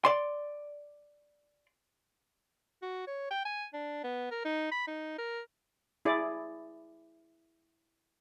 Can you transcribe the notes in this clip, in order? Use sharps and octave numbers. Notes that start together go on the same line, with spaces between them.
D5 C6
F#4
C#5
G5
G#5
D4
B3
A#4
D#4
B5
D#4
A#4
E4 G#4 D5